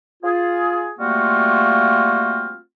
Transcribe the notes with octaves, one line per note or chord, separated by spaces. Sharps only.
F4 G#4
G3 A3 A#3 C4 F4 F#4